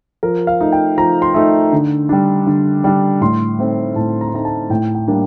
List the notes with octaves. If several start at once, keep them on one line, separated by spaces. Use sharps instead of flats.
F3 A#4
F5
A3 D#4
G5
F3 A#5
C6
A3 D#4
D3
G3 D4
D3
G3 D4
A2 C6
A3 C4 D#4
A2 A5
A#5
C6
A3 C4 D#4 A#5
A5
A2 G5
G5
G3 A#3 D4